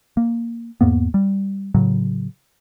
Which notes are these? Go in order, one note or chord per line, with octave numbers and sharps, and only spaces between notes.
A#3
E2 G#2 A#3 B3
G3
A2 C#3 F#3